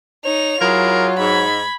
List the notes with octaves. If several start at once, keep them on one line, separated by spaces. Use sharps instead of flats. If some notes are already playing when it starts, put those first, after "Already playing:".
D#4 C#5 F7
F#3 E4 F4 G#4 A#4
G#2 B5 G#6